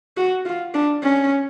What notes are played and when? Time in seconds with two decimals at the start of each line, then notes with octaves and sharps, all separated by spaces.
0.17 F#4
0.45 F4
0.74 D4
1.03 C#4